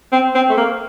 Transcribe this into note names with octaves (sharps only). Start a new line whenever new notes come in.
C4
C4
A3
A#3